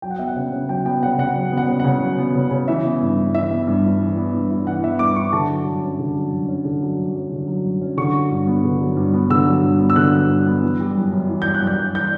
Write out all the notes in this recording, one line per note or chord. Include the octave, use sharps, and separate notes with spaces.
F#3 G5
F#5
B3 E5
F#5
C#3
C#3
F#3 G5
B3 G5
C#3 F#5
C#3 F#5
F#3
B3
F#5
C#3
F#5
C#3
F#3
B3
C#3
C#3
E3 E5
B3
G2
E4
E3 E5
B3
G2
E4
E3
B3
G2
E4
E3 F#5
B3 E5
G2 D6
E4 C#6
D3 A5
F#3
F#2
C#4
D3
F#3
F#2
C#4
D3
F#3
F#2
C#4
D3
F#3
F#2
C#4
D3 C#6
F#3
G2
B3
D3
F#3
G2
B3
D3 E6
F#3
G2
B3
E6
D3 F#6
F#3
G2
B3
E3
G3
F#2
F#2
E3
G3 G6
F#6
F#2 G6
F#2
E3 G6